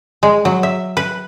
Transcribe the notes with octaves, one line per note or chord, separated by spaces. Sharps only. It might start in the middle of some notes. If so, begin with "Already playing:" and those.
G#3
F#3
E5
B4